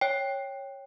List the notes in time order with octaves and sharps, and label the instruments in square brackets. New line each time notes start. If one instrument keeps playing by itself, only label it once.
[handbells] C#5 G5